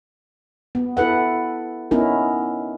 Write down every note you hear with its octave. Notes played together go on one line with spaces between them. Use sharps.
B3
E4 A4 B4 F#5
B3 C#4 D#4 E4 A#4